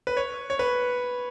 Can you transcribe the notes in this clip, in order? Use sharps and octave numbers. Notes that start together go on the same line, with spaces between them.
B4
C#5
C#5
B4